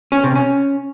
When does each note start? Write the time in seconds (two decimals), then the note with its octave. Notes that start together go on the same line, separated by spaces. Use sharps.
0.12 C#4
0.24 C3
0.36 C#4